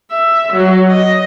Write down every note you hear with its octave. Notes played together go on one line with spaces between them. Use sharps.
E5
F#3
D#5